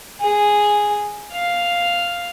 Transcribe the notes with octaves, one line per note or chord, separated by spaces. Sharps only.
G#4
F5